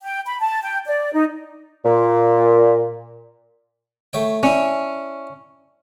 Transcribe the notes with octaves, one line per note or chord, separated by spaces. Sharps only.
G5
B5
A5
G5
D5
D#4
A#2
A3 C#5 G5
C#4 D4 E4